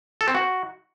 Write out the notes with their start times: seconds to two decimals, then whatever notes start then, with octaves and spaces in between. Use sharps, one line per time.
0.21 A4
0.28 C4
0.35 F#4